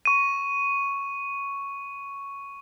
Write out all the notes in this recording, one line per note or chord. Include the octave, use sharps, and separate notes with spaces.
C#6 D#7